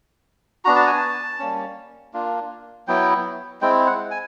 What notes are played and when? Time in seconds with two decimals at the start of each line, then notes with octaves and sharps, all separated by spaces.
0.65 B3 D4 F#4 A#5
0.76 A5
0.87 G#5
0.97 A5
1.39 G3 A#3 C#4
2.13 A#3 D4 F4
2.87 F#3 B3 E4 G5
3.61 G#3 C4 E4 G5
3.87 F#5
4.11 G#5